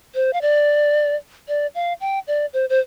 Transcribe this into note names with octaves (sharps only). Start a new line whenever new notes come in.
C5
F5
D5
D5
F5
G5
D5
C5
C5